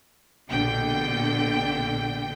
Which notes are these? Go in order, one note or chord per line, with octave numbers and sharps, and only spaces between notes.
A#1 B2 D3 G5